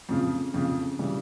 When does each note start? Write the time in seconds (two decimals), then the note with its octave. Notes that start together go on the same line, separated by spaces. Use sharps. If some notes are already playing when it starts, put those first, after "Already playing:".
0.09 F2 C#3 F3
0.54 F2 C#3 F3
0.99 C#3 E3 G3